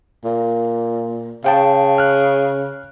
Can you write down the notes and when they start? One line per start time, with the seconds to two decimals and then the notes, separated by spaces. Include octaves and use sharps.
0.24 A#2
1.44 C#3 F5 G5 A5
1.98 F6 F#6